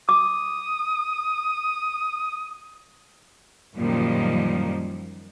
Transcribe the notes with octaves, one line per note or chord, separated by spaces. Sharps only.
D6 D#6
F#2 A#2 D#3 F3 G3